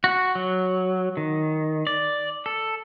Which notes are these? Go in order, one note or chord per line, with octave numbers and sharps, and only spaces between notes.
F#4
F#3
D#3
D5
A4